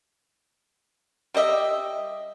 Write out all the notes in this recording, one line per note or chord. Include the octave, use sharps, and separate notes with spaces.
G3 G4 D#5 E5